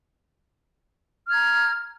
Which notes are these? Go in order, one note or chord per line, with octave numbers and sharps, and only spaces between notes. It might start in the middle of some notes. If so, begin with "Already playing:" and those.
A#5 F6 G#6